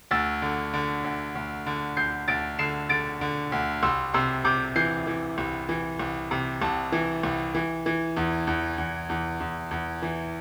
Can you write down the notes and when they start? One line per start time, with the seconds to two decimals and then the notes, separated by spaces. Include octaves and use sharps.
0.11 D2 E6 A6
0.42 D3
0.74 D3
1.04 D2
1.35 D2
1.67 D3
1.97 D2 G6 C7
2.28 D2 A6 D7
2.59 D3 C7 E7
2.89 D3 A6 D7
3.21 D3
3.52 D2
3.83 C2 C6 E6
4.14 C3 C6 E6
4.45 C3 D6 G6
4.76 E3 G6 C7
5.07 E3
5.38 C2
5.69 E3
5.99 C2
6.31 C3
6.61 C2 A5
6.92 E3
7.23 C2
7.55 E3
7.86 E3
8.17 E2
8.47 E2
8.78 E2
9.09 E2
9.40 E2
9.71 E2
10.02 E3